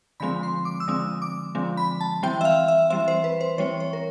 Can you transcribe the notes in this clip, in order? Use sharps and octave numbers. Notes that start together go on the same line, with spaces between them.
D3 F3 G#3 C4 B5
C6
D6
E6
D3 F3 G#3 C4 D#6
D6
D3 F3 G#3 C4
B5
A5
E3 G3 C4 G5
E5
F5
E5
E3 G3 C4 E5
C5
B4
C5
E3 G3 C4 C#5
C#5
A#4